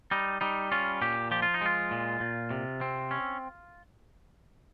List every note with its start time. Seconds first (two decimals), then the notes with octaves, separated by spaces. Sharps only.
0.11 G3 D#4
0.41 G3 D#4
0.72 C#4 F4
1.01 A#2 G4
1.31 F3 G4
1.42 F4
1.54 D#4
1.61 G#3 F4
1.91 A#2
2.20 A#2
2.51 C3
2.81 C4
3.11 C#4